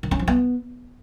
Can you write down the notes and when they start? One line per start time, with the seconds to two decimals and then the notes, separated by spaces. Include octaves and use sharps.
0.03 D#3
0.11 C#4
0.19 F3
0.28 B3